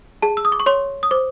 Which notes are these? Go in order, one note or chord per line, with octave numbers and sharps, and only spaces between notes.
G#4 A5
E6
D#6
D6
C#6
C#5 C6
D#6
C5 D6